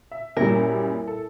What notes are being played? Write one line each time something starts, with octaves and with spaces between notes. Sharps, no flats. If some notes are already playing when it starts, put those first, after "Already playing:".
E5
F#2 A#2 G3 E4 A#4
A4